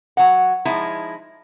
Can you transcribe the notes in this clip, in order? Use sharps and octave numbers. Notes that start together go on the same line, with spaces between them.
F#3 F#5
F3 G#3 D#4 E4